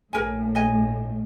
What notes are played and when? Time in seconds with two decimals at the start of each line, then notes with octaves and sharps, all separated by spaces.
0.13 A#1 A2 A#4 G#5
0.55 D#5 G#5